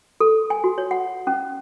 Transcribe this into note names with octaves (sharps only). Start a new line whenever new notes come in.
A4
G#5
F#4
C#5
F#5
C#4